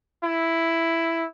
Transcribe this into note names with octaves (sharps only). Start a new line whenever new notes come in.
E4